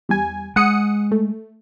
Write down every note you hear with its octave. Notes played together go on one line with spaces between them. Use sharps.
E2 G3 G#5
G#3 F#5 D#6 C#7
A3